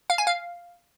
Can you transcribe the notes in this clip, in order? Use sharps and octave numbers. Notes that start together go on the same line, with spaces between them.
F5
G#5
F5